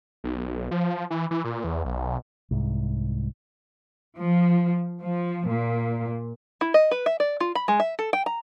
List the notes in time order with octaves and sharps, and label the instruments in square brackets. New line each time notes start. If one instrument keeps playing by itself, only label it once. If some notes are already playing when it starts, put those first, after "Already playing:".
[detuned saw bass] B1
F3
E3
E3
A#2
E2
B1
[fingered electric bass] C2 G#2
[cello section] F3
F3
A#2
[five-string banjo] E4
D#5
B4
E5
D5
F4
B5
G#3
E5
A4
G5
A#5